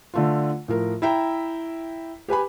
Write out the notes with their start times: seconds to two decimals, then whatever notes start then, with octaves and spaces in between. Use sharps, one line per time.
0.14 D3 A3 F4
0.68 A2 F3 A#4
1.02 E4 E5 G5 A#5
2.28 G4 B4 G#5 B5